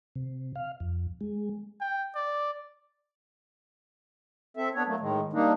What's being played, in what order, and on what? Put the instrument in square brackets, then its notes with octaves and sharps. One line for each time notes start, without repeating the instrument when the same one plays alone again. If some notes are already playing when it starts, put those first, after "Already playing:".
[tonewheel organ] C3
F5
F2
G#3
[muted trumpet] G5
D5
[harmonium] C4 A4 E5
B3 D4 C#5
F#3 A3 A#3
A2 D#3 G#3
G3 A#3 D4 D#4